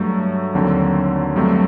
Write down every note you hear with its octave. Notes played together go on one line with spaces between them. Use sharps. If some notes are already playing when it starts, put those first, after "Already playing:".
Already playing: G2 F#3 A3
D#2 D3 F#3 C4
G2 F#3 A3 C4